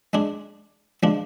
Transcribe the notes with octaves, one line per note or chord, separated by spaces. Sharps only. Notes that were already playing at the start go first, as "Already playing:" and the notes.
G#3 D4 G#4
F3 G#3 D4